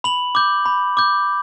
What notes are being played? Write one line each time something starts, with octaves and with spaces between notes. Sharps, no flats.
B5 F#7
D6 G6
B5
D6 G6